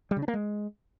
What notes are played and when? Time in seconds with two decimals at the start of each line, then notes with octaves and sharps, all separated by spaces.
0.11 G3
0.17 C#3
0.22 D4
0.28 A#3
0.34 G#3